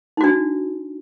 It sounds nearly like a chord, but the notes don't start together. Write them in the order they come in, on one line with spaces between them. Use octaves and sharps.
D#4 F#4 D4